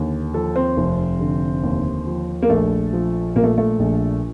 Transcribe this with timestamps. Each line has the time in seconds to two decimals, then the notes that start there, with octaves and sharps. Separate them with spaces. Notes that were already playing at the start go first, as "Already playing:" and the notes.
Already playing: D#2 D3
0.34 F3 A4
0.56 C4
0.77 F1
1.20 D3
1.63 D#2
2.07 F3
2.43 A#3
2.49 A#1 A3
2.93 F3
3.36 A#2 A#3
3.44 A3
3.58 A3
3.79 A#1